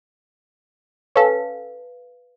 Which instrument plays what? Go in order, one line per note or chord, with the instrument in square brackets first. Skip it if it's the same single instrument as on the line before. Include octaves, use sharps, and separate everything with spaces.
[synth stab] C#4 A4 [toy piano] B4 F5